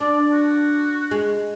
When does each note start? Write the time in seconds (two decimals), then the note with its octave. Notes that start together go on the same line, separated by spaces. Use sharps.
0.01 D4 D5
0.33 F#4
1.11 G#3